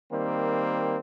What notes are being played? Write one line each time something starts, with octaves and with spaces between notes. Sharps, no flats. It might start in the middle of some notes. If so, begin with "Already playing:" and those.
D#3 G3 A#3 C4